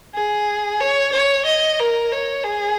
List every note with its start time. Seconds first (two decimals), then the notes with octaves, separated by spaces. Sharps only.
0.15 G#4
0.81 C#5
1.13 C#5
1.46 D#5
1.79 A#4
2.12 C#5
2.44 G#4